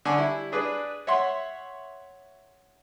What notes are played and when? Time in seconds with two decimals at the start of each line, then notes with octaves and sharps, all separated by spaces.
0.05 D3 G#5 C#6
0.17 G3 E4
0.52 D4 G#4 B4 D5
1.07 C#5 E5 F#5 C6